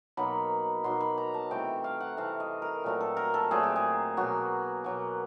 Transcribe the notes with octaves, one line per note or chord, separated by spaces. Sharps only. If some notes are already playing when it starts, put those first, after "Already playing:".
B2 F#3 A#3 D#4 B5
B2 F#3 A#3 D#4 C6
B5
A#5
A5
C3 E3 A3 C4 G5
F5
F#5
C3 E3 A3 C4 F5
D#5
A#4
A#2 F#3 A3 C4
A4
A#4
A4
A#2 F#3 A3 C4 G#4
G4
G#4
B2 F#3 A#3 F#4
B2 F#3 A#3